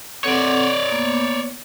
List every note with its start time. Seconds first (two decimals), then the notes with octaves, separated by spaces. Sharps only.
0.24 C4 A4 C#5 D5 F#5
0.92 A#3 B3